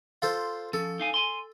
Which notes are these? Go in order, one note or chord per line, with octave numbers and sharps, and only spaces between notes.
F4 A4 C5
F3 C#4 A4
D#4 F5 G#5
G#5 C6